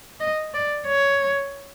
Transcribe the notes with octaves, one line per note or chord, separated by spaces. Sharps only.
D#5
D5
C#5